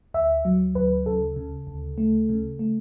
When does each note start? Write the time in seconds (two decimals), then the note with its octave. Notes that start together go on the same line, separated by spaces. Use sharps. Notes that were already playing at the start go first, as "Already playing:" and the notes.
0.14 D2 E5
0.45 F#3
0.75 D2 B4
1.06 C#3 A4
1.36 C#3
1.67 D2
1.98 A3
2.29 C#3
2.59 A3